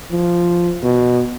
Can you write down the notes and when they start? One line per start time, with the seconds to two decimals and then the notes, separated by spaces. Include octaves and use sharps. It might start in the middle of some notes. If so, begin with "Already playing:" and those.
0.12 F3
0.84 B2